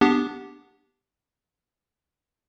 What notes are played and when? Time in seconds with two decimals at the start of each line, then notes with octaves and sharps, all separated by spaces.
0.01 B3 D4 G4